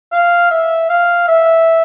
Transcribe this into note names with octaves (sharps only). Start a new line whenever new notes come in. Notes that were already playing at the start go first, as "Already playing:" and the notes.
F5
E5
F5
E5